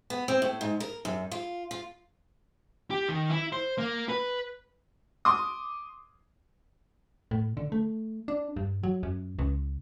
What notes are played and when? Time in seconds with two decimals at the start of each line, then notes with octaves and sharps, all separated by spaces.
0.10 B3
0.28 C4
0.42 A2
0.61 G#2
0.80 A#4
1.05 F#2
1.31 F4
1.71 F4
2.91 G4
3.09 D#3
3.30 E4
3.52 C5
3.78 A#3
4.09 B4
5.25 C6 D6 D#6
7.31 A2
7.57 D3
7.72 A3
8.28 D4
8.56 G2
8.83 F#3
9.03 F#2
9.39 C#2